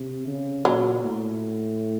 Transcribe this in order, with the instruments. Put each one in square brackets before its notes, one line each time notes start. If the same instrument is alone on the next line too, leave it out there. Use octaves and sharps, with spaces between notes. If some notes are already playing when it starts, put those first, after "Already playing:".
Already playing: [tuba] C3
C#3
[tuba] A#2 [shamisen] F#3
[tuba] A2